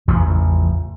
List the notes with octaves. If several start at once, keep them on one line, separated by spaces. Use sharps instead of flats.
A1 E2 C#3 F3